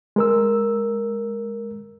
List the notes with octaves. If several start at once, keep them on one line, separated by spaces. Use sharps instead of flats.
G#3 A#4 E6